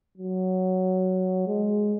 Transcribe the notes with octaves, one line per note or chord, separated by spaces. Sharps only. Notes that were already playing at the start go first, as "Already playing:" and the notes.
F#3
G#3